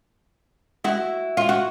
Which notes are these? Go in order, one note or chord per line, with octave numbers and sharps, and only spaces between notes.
E4 F#4
F4
F#4